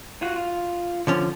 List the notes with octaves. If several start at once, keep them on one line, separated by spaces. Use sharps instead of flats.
F4 F#4
F4
D3 F3 C#4